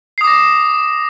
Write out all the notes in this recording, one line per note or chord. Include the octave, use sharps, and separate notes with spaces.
D6 D#6 A#6 C7